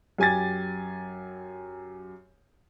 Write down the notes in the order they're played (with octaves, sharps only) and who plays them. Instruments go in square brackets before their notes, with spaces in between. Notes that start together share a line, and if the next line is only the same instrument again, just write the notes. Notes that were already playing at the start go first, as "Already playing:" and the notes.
[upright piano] F#2 G4 G#5 G#6 A6